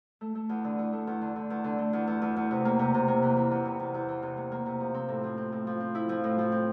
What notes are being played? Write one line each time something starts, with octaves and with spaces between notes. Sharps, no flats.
A3
A3
E2
D3
E2
A3
E2
D3
D3
E2
D3
A3
E2
E2
E2
E2
C3
A#3
C3
C3
A#3
E3
E3
E2
C3
E2
E2
E3
C3
A#3
A#3
C3
F3
C4
A2
F3
C4
A2
F3
C4
E4
F3
A2
F3
C4